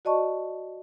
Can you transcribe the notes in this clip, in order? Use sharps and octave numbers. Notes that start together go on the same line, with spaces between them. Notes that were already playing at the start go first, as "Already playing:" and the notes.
F#4 D5 D#5 A5 C#6